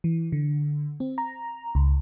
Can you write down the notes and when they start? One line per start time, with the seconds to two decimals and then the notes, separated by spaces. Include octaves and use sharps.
0.04 E3
0.32 D3
1.00 C4
1.18 A#5
1.75 C#2